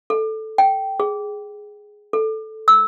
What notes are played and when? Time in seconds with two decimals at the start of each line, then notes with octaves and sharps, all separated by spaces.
0.10 A4
0.58 G5
1.00 G#4
2.13 A4
2.68 E6